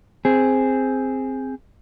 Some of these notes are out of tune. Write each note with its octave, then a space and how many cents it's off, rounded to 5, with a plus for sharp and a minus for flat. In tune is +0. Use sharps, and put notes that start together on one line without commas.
C4 +0 G#4 +0